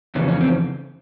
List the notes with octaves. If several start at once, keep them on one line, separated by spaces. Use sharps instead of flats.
F2 C#3 E3 C#4
C#4
C4